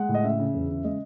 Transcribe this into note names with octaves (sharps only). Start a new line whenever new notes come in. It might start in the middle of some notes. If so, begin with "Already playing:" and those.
Already playing: G#3 F#5
A2
D#5
C#3 E5
C#3
E2
C#3
G#3 D#5